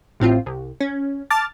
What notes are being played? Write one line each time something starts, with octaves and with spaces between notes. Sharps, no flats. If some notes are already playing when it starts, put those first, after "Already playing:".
A1 A2 C4 F4
C2
C#4
A5 D6 F6 A6